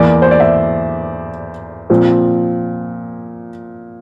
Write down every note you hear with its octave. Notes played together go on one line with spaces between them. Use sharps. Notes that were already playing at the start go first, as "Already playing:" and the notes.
Already playing: E2 E3 A#3 D5
C5
D5
E5
A#2 F3 C4